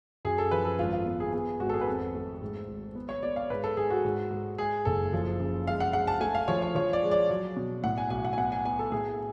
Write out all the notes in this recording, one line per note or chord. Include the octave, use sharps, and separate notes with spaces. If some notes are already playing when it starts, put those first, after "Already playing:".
F#2 G#4
A4
F3 B4
A4
G#1 F4
F4
B3
G#4
B3 G#4
G#1 F#4
A4
G#4
B4
F2 A4
A3
G#2
G#1
B3
C#5
B3 D5
F5
G#2 B4
A4
G#2 G#4
F#4
G#2
G#2
G#3 G#4
F#1 A4
F3
C#3
G#3 F5
F#5
G#3 F#5
A5
A3 G#5
F5
F3 C#5
C#5
F3 C#5
D5
G#3
D5
F#3
B2
A2 F#5
G#5
B1 G#5
F#5
G#5
B3 F#5
G#5
B3 G#5
A4
A2 G#4